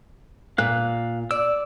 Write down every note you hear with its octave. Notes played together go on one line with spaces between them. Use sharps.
A#2 F5 F#6
D5 E6